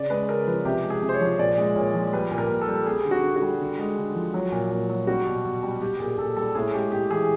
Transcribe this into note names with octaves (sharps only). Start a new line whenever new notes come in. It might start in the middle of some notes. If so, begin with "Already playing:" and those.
Already playing: C#3 D5
G#3 B4
C#3 A#4
F3 B4
C3 G4
G#3
G#4
C3
C5
C#5
F3
A#2 D5
G#3
A#2 C#5
F3
G3 B4
A#2
A#4
A#2
A4
G3
G3 G#4
D3
F#4
D3
F#4
G3
D3
G#3
D3
F3
F#3
A#2
A#2
F#3
G3 F#4
B2
B2
G3
G3 G4
A#2 G#4
A#2 A4
G3 A4
A2 G#4
G#3 G4
A2 G4
E3 G#4